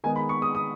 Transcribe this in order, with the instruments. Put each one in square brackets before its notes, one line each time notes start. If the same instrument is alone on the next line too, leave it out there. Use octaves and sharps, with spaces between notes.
[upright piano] D#3 G#3 B3 D#4 G#5
B5
C#6
D#6
D#6